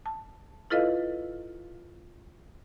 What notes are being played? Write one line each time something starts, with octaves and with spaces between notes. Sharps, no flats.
A5
E4 F4 A4 B4 D#5 F5